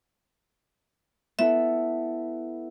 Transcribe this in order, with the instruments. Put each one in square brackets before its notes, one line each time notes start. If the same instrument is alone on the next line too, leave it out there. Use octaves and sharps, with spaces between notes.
[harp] B3 E4 A4 [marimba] E5